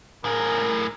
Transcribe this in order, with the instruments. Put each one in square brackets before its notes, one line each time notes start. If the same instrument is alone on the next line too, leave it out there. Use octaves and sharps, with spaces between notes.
[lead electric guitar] A2 G#4 [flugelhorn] A#4